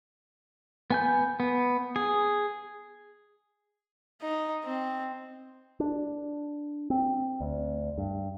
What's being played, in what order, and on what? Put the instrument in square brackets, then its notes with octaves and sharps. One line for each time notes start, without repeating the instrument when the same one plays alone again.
[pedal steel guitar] B3 G#5 G6
B3
G#4
[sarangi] D#4
C4
[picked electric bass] D4
C4
D2
G2